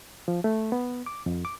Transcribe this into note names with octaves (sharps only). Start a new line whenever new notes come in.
F3
A3
B3
D6
F2
D6